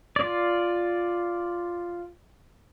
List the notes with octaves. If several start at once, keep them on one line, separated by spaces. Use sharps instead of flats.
F4 D5